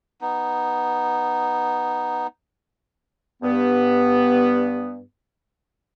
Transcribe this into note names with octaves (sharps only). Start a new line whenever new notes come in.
B3 D#4
G2 B3